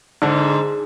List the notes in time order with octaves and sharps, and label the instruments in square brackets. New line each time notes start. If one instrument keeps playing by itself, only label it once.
[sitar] G#2 [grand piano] D3